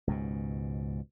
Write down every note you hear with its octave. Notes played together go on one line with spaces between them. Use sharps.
C#2 G#2 B2